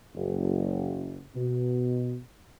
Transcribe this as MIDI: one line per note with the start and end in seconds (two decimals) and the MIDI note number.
0.14 1.21 30
1.34 2.17 47